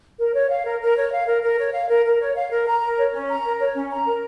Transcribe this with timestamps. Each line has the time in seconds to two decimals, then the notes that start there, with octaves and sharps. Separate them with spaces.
0.18 A#4
0.33 C#5
0.49 F5
0.64 A#4
0.80 A#4
0.96 C#5
1.11 F5
1.26 A#4
1.42 A#4
1.57 C#5
1.72 F5
1.88 A#4
2.04 A#4
2.19 C#5
2.35 F5
2.50 A#4
2.66 A#5
2.82 A#4
2.97 C#5
3.13 C#4
3.28 A#5
3.43 A#4
3.59 C#5
3.74 C#4
3.90 A#5
4.05 A#4